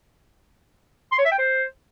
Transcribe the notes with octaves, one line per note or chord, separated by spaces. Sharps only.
C6
C#5
E5
G5
C5